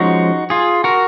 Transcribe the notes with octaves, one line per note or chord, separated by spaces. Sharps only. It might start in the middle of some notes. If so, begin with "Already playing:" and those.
Already playing: F3 G#3 C#4 D#4 F#4
F4 G#4
F#4 A#4